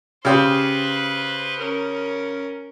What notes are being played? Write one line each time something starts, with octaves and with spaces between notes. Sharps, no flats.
C#3 G4 B4 C5 C6
C#4 A#4